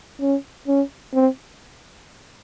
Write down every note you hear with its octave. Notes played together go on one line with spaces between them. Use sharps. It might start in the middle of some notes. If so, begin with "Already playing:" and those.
C#4
C#4
C4